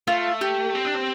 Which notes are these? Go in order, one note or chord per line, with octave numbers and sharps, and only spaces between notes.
A3 F4
G4
C4
D4
C4